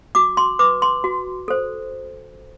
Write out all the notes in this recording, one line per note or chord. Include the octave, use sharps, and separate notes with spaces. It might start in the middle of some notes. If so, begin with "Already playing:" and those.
F#4 D6
C6
B4 D6
C6
F#4
A4 C5